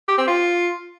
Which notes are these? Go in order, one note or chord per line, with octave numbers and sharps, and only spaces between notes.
G4
C4
F4